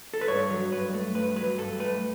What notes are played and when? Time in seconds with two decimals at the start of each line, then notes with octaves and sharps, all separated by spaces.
0.14 A4
0.21 B4
0.28 G2 C#5
0.50 F#3
0.72 G2 B4
0.94 A3
1.15 G2 B4
1.36 F#3 B4
1.58 G2 A4
1.80 A3 B4